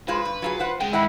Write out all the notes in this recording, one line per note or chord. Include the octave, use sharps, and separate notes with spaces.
G#3 F4 B4 C5
G2
F#3 F4 G#4
F4 C5 F#5
C#3 G#3 G5
G#2 D#3 E4 D#5 F#5 G5 B5